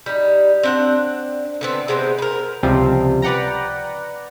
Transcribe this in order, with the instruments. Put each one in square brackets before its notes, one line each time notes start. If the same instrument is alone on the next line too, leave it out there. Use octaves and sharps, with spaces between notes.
[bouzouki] G3 D#4
C4 D4 F#5
D3 B3 C4
C3 G#3 B3 C5
A#4 B4
[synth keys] C#2 C3 F3 G3 C4
B4 D5 F#5 G5 A#5